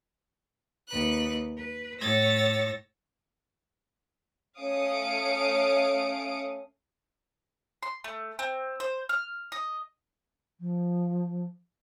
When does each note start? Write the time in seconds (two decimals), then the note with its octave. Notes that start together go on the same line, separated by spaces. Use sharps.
0.88 D#2 B4 F#6
1.56 B4
2.00 A2 C#5 E6 A6 A#6
4.58 A3 C#4 F5 D#6 C#7 D7
7.83 C6
8.04 A3
8.39 C4
8.80 C5
9.09 F6
9.52 D#5
10.60 F3